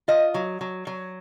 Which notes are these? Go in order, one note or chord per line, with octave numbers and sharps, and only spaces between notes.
F4 D#5
F#3
F#3
F#3